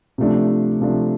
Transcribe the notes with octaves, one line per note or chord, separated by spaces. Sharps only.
C3 F3 A3 D4
C3 F3 A3 D4